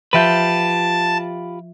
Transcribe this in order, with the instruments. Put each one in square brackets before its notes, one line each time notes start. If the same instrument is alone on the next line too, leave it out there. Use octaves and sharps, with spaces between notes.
[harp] F3 E5 G6 [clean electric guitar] F4 G4 B4 [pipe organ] A5